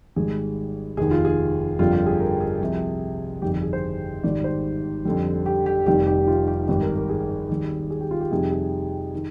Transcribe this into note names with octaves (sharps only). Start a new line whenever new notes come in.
G#1 G#2 G3 G#4
F1 D#2 D#3 G#4
F4
G#4
G1 F2 D3 G3 F4
G4
G#4
A#4
G#4
C2 C3 F3
G1 F2 D#3 G3 G4
G4
G#4
C5
G#1 G#2 D#3 G3 D5
C5
F2 D3 G3
G4
G4
F1 F2 D#3 G3 G4
G4
F4
G4
G#1 G2 D#3 G4
A#4
A#4
G#4
D#2 D#3 G3
G#4
G4
F4
G4
F2 C3 D#3 G3 G#4
G#4
D#3